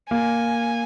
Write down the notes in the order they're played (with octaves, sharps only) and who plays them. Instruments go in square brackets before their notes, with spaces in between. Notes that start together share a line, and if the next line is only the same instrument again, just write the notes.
[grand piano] A#3 [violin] G#5